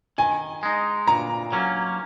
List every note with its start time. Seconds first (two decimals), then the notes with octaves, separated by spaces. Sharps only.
0.18 D#3 G#5
0.63 G#3 D#4
1.08 A#2 A#5
1.52 F#3 A#3 C#4